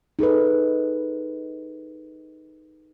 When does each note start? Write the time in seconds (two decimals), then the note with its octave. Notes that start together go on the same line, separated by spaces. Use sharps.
0.19 D#4 G#4 A4 B4